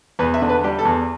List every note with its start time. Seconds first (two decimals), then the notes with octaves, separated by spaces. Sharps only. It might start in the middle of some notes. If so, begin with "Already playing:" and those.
0.19 E2 B4
0.34 E5
0.42 D3
0.49 B4
0.64 G3 G4
0.79 A4
0.85 E2